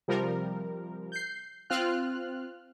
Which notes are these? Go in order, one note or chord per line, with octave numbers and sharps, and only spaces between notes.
C3 F3 G3 A#4
G6 C7
C4 F4 F6 F#6